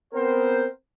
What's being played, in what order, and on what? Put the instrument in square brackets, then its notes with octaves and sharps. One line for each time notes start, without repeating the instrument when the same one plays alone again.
[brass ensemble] B3 C4 A#4 C5